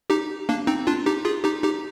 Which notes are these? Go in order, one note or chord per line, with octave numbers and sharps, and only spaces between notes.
D#4 G4
A#3 D4
C4 D#4
D4 F4
D#4 G4
F4 G#4
D#4 G4
D#4 G4